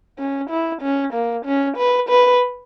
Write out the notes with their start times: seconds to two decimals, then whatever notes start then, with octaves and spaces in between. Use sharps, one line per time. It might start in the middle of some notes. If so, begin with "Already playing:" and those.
0.19 C#4
0.50 E4
0.82 C#4
1.14 A#3
1.46 C#4
1.77 B4
2.09 B4